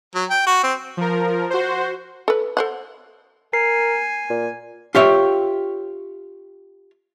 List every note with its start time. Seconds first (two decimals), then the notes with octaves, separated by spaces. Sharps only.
0.15 F#3
0.30 G5
0.46 F#4
0.63 C4
0.97 F3 A#4
1.50 F#4 C5
2.28 A4 B4
2.57 A4 C5 F#5
3.54 A#4 G#5 C7
4.30 A#2
4.95 F4 G4 C#5 E5